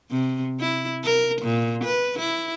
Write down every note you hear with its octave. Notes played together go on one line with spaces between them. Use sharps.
C3
E4
A#4
A#2
B4
E4